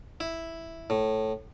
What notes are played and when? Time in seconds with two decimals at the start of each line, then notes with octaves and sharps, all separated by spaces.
0.20 E4
0.90 A2